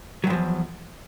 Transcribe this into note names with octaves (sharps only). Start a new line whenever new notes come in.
E2 G2 F3 F#3